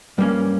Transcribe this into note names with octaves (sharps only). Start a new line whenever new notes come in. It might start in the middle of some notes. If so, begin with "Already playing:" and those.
G2 G3 A#3 C#4